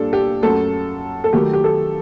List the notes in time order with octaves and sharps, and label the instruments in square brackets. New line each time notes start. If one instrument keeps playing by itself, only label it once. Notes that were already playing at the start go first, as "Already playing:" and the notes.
Already playing: [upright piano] A#2 G3 D4 A4
G4
F#2 F#3 A3 A4
A4
D#3 F#3 A3 G4
G4
A4